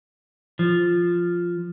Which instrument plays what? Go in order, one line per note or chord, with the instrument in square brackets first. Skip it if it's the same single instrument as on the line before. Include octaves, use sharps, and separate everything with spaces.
[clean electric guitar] F3